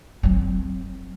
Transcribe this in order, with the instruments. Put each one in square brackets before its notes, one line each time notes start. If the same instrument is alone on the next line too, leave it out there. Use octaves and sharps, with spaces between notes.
[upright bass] F#3 C4